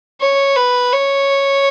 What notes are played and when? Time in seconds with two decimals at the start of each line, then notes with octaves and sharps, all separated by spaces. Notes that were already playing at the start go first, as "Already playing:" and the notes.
0.21 C#5
0.56 B4
0.92 C#5